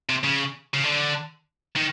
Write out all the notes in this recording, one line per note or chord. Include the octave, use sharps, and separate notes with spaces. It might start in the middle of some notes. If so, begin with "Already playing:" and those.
C3
C#3
C#3
D3
D#3